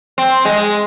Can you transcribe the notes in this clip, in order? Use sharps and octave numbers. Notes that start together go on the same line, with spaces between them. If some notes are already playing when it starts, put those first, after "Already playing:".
C4
G#3